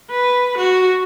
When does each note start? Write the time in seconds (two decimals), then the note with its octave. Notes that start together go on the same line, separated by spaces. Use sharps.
0.10 B4
0.57 F#4